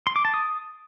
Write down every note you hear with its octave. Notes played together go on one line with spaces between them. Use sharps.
C6
D6
A5
D#6